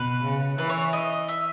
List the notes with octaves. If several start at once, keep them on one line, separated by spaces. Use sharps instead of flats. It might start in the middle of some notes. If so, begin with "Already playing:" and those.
Already playing: B2 B4
C#3
E3 B4
C#5
D#5
E5